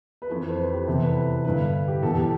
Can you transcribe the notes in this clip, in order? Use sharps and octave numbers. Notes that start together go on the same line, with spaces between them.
B4
F2 E3 A4
C5
B4
G4
E2 C3 E3 A4
B4
B4
G2 D3 B4
G4
E2 B2 A4
G4
A4